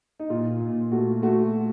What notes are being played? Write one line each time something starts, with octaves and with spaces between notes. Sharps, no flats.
D#4
A#2 F4
A#2
A3 F#4
A3 F#4